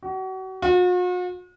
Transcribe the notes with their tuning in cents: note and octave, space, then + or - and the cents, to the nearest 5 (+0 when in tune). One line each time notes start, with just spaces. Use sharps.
F#4 +35
F#4 -45